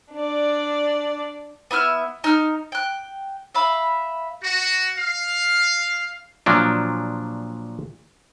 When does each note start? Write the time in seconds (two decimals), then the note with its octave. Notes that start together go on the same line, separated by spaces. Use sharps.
0.12 D4 D5
1.71 B3 E4 E5 F6
2.24 D#4 F6
2.72 G5 F#6
3.55 E5 F5 B5
4.43 F#4
4.96 F5
6.46 A#2 F3 F#3 D4